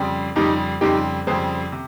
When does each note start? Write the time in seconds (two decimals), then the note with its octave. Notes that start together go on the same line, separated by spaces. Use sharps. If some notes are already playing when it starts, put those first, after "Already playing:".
Already playing: F2 C#3 G3 C4
0.36 F2 C#3 G3 C4 D#4 G4
0.81 F2 C#3 G3 C4 D#4 G4
1.27 F2 C#3 G3 C4 G#4 C5
1.72 C3